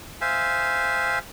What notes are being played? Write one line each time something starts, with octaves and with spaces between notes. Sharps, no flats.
C5 E5 F5 G#5